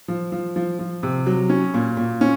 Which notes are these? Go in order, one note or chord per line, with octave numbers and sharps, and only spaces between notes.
F3
F3
F3
F3
C3
F#3
C#4
A#2
A#2
C#4